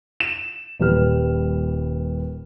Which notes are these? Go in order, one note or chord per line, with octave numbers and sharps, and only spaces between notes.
E7
D#1 G3 B4 F6